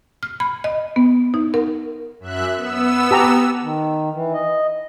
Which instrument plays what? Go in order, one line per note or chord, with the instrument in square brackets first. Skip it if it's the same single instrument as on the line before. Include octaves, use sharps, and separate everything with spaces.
[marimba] F6
B5
D#5
B3
D#4
A#4
[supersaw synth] F#2 E5 F#6
B3 E6
[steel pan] G4 A5 A#5
[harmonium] D#3
E3
D#5